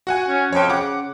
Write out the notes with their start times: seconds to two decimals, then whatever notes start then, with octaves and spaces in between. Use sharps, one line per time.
0.07 F#4 F#5 G#5
0.28 C#4
0.53 F2 C#5 G5
0.70 C#3 F#5 D6